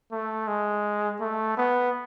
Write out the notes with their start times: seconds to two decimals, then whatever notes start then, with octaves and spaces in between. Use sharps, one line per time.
0.12 A3
0.48 G#3
1.20 A3
1.57 B3